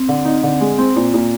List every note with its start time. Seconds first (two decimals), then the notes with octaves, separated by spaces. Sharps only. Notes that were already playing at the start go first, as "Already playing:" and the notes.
Already playing: C4
0.08 D3
0.25 D#4
0.43 D3
0.61 G#3
0.78 C4
0.96 A#2
1.14 A#2